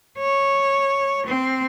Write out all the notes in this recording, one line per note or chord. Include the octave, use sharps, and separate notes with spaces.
C#5
C4